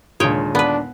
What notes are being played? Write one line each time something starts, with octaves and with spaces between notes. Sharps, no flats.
D#2 A#2 D3 G#3 C#5 G5 D#6
B3 D4 B4